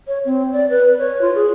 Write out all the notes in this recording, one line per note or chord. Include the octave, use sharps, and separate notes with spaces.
C#5
C4
D5
B4
C#5
F4
G#4